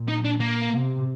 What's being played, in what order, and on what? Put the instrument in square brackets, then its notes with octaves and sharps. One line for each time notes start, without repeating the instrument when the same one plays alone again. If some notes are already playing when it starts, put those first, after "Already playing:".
Already playing: [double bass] A#2
[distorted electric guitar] D#4
D4
A#3
[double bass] C3